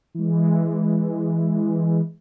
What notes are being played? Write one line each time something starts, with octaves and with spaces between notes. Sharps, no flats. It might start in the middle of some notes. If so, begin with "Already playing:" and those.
E3 G#3